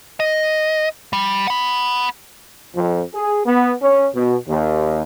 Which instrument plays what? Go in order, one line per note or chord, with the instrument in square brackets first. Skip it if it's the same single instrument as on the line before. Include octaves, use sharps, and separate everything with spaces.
[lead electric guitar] D#5
G3
F#5 B5
[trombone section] F2
G#4
B3
C#4
B2
D#2